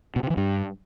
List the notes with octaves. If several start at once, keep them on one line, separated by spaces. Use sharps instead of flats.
B2
C3
E3
G2